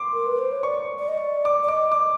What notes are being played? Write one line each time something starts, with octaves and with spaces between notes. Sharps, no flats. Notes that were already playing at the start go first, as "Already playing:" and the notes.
Already playing: C6 D6
A#4
B4
C5
C#5
D5 C#6
D5
D#5
D5
D6
D5
D#5 D6
D6